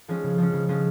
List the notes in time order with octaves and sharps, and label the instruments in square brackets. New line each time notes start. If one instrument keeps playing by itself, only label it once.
[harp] F3 G#3 C#4
C#3
F3 G#3 C#4
C#3
F3 G#3 C#4